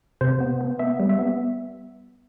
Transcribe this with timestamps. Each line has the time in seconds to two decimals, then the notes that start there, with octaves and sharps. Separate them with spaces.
0.21 C3 C5
0.40 B3
0.61 B3
0.79 B3 E5
1.00 G3
1.09 E5
1.19 B3